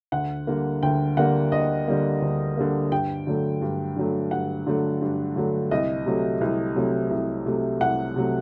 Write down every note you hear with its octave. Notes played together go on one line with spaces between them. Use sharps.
D2 F#5
D3 G3 A#3
D2 G5
D3 G3 A#3 F#5
D2 D#5
D3 G3 A#3
D2
D3 G3 A#3
G2 G5
D3 F#3 A3
G2
D3 F#3 A3
G2 F#5
D3 F#3 A3
G2
D3 F#3 A3
C2 D#5
C3 F#3 A3
C2
C3 F#3 A3
C2
C3 F#3 A3
C2 F#5
C3 F#3 A3